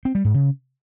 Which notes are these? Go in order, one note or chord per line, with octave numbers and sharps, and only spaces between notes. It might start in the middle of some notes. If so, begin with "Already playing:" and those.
C4
G3
G#2
C#3